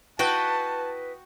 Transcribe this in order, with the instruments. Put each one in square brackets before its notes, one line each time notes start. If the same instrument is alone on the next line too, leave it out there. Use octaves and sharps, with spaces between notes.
[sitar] E4 B4 D#5 [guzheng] F#4 G5 [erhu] A5